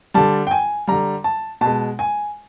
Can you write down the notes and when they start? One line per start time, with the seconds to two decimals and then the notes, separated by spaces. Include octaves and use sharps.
0.14 D3 G3 A5
0.47 G5
0.51 G#5
0.87 D3 G3 A#5
1.24 A5
1.61 B2 G#3 A5
1.99 G#5